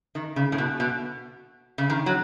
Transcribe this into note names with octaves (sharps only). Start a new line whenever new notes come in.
D#3
C#3
A2
B2
B2
C#3
D#3
F#3